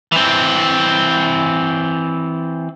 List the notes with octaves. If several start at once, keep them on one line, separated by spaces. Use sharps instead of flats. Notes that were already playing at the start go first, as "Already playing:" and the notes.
E3 C4